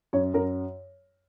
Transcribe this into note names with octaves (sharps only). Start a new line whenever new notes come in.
F#2 C#5
F#2 A#4